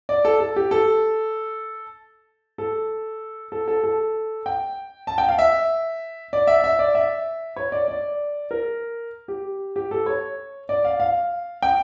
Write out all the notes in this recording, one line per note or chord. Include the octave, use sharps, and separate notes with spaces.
D5
A4
A4
G4
A4
A4
A4
A4
A4
G5
A5
G5
F5
E5
D5
E5
E5
D5
E5
C#5
D5
D5
A#4
G4
G4
A4
C#5
D5
F5
F5
G5